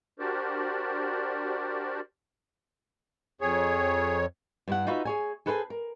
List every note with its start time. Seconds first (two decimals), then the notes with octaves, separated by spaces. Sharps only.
0.19 D4 F#4 G4 A#4 C5 D5
3.41 F2 G#4 C#5
4.68 G2 E4 F#5
4.87 D#4 F4 F#4 B4 E5
5.05 G#4 C#5 G#5
5.46 G#4 A4 B4 C5 F#5 G#5
5.70 A#4